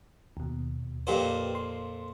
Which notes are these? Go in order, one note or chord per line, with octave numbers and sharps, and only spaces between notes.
D#2 B2
F2 A#2 G4 B4 C5
C6